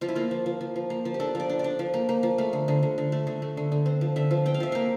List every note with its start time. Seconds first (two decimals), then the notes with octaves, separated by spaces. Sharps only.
0.01 F3 F4
0.09 E4
0.16 A#3 F4
0.31 F3
0.46 F3
0.61 F3
0.76 F3
0.90 A#3
1.05 F3
1.14 G4
1.20 D4 A4
1.35 F3 D5
1.50 D4
1.59 D5
1.64 D4
1.79 F3
1.94 A#3
2.09 A#3
2.23 F3
2.38 A3 F5
2.53 D3
2.68 D3
2.83 D3
2.98 D3
3.12 A3
3.27 D3
3.42 A3
3.57 D3
3.72 D3
3.86 C4
4.01 F3
4.16 D3 E5
4.31 F3
4.46 C4 G5
4.54 F5
4.60 F3 E5
4.72 A#3 F5